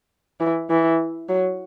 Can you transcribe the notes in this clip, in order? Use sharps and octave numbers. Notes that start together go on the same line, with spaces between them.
E3
E3
F#3